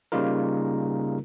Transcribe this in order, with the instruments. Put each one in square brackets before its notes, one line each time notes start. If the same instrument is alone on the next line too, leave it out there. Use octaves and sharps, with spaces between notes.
[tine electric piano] C#3 G3 A#3 D#4 F4 A#4